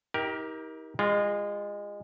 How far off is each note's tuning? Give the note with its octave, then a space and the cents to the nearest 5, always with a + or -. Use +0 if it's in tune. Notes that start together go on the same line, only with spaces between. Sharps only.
D#4 +40 G4 +0 A#4 +15
G#3 -25 F4 +0